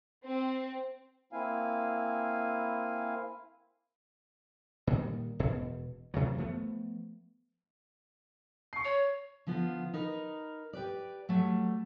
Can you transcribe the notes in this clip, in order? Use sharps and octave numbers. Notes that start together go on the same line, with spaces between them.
C4
A#3 C4 E4 F5 G#5
A#2 D#3 G3
E1 B2
F#2 C3 E3 F#3
F3 A3 B3
C#6 C7
C#5
D3 F3 B3 F4
D#4 A#4 B4
G4 B4 D5
F#3 G3 A3